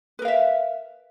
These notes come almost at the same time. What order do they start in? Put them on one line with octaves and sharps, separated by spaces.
B4 A#4 F5 E5